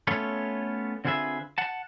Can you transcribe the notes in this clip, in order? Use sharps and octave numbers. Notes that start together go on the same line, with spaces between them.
A3 B3 C#4 F4 A4 C#5
D3 C4 F4 G#4 B4 E5
F#5 A5